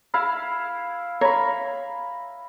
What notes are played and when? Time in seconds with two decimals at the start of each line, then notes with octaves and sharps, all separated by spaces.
0.14 E4 F5 B5
1.21 C#5 A#5 B5